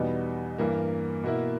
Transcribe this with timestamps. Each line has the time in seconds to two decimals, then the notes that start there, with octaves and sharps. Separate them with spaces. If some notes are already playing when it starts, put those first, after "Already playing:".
Already playing: E2 B2 G3 B3 D#4
0.58 G2 E3 A#3
1.23 B2 A#3 E4